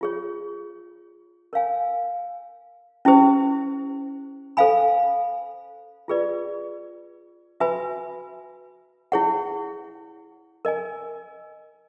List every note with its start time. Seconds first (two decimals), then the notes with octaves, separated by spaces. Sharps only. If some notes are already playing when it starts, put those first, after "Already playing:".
0.01 F4 G#4 C#5
1.53 A#4 C#5 F5 G#5
3.05 C#4 E4 G4 C5
4.57 A4 C5 F5 G#5 B5
6.08 F4 G#4 B4 D5
7.60 F#4 B4 E5 G#5 B5
9.12 E4 G#4 C#5 F#5
10.65 A#4 D#5 G#5